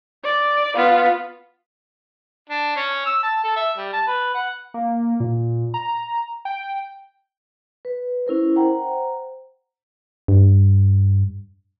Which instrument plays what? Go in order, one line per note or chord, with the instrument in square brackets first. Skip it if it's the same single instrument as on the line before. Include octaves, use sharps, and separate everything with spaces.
[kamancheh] D5
B3 F4
[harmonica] D4
C#4
E6
A5
A4
E5
G3
A5
B4
F#5
[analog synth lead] A#3
A#2
A#5
G5
[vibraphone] B4
C#4 E4 A#4 C5
C5 F#5 G5 A#5
[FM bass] G2